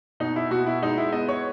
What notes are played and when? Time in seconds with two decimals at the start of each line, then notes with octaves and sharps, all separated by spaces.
0.20 B2 D#4
0.36 E4
0.51 B2 F#4
0.66 E4
0.82 G#3 D#4
0.98 E4
1.12 B3 D#5
1.28 C#5